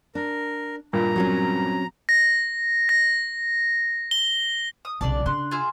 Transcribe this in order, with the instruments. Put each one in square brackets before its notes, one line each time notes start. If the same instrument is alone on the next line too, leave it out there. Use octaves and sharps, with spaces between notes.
[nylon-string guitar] D4 [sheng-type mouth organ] A#4
[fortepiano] G2 A#2 [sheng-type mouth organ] A#5
[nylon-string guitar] F#3 C4 C#4
[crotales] A#6
A#6
G7
[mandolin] D#6
[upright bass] B1 C#3 [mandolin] D4 D5 A5
[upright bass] C#3 D4 [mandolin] C6 F#6
[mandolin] F4 G#4 E5